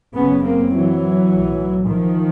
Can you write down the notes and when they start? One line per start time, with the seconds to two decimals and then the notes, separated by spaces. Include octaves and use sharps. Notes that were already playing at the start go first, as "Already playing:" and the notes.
0.16 F#1 F#2 C#3 B3 C#4
0.45 A#3 C4
0.74 E3 F#3
1.32 B1 A2
1.89 D#3 F3